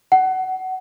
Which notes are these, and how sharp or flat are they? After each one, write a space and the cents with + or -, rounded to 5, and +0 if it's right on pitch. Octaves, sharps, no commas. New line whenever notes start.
F#5 +20